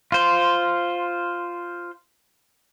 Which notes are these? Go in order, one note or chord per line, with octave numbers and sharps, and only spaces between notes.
F4 C5